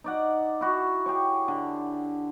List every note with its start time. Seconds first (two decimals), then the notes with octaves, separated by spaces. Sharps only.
0.04 D#4 D5 F#5
0.61 E4 F#4
1.06 G4 G#4 C#5
1.48 D3